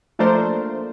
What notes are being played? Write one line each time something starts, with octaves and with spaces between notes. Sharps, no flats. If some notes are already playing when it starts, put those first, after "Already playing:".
F3 A3 A#3 D4 A#4 C5